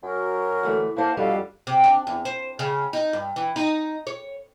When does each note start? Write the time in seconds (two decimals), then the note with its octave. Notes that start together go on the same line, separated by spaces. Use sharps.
0.04 F#2 F#4 A#4
0.63 D2 E3 A3
0.97 A#3 E4 C5 F#5 A5
1.17 F2 B2 G3 D4 A4 F5
1.67 C3
1.84 D4
2.07 E2
2.25 C5
2.59 C#3
2.93 D#4
3.13 G2
3.36 E3
3.56 D#4
4.07 C#5